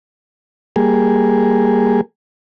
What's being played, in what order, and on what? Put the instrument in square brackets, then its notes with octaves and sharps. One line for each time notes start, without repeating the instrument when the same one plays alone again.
[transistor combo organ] G3 A#3 G#4